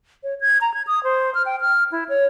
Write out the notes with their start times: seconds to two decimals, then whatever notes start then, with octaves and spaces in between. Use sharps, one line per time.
0.23 C#5
0.41 G#6
0.61 A#5
0.74 G#6
0.87 D#6
1.04 C5
1.35 F6
1.46 G5
1.61 F6
1.92 E4
2.09 C#5